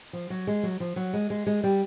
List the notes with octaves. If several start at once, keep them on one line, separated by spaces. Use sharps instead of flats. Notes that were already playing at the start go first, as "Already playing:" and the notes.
F3
F#3
G#3
F#3
F3
F#3
G#3
G#3
G#3
G3